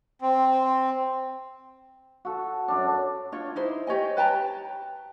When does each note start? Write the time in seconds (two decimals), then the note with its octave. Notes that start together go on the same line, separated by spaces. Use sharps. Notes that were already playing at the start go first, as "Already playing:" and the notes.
0.21 C4
2.25 F#4 A4
2.68 F#2 D4
3.32 D4 F4 C#5
3.56 D#4 E4 C5
3.87 G4 C#5 D#5 G#5
4.17 B4 G5 A5 A#5